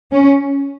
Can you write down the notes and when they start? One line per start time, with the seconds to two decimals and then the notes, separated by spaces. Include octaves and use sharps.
0.12 C#4